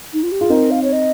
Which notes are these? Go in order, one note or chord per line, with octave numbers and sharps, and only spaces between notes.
D#4
F4
G4
F4 G#4
C4 D#4 A#4
F5
C#5
D#5